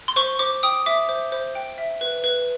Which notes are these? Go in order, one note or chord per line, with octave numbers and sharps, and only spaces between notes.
C6
C5 C#6
C5 D6
G5 D#6
E5 D6
C5
C5
G5
E5
B4
B4